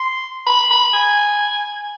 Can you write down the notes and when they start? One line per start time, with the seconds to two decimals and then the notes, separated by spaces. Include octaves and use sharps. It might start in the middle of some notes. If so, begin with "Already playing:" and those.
Already playing: C6
0.46 B5
0.70 B5
0.93 G#5